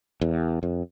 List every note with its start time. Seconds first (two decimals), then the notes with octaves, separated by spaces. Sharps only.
0.21 E2
0.63 F2